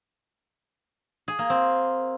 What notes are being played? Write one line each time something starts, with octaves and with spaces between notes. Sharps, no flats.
G#4
A#3
C4